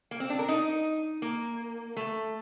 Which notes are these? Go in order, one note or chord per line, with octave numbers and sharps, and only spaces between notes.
A#3
C4
D4
A#4
D#4
A#3
A3